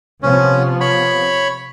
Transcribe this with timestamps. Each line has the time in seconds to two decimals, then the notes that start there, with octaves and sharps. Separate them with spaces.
0.23 C3 F3 B3 C#4
0.81 C#5 B5